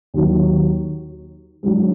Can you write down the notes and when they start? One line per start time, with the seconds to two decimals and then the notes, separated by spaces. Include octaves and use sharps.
0.14 D#2 D#3 F#3
1.63 G#2 F#3 D4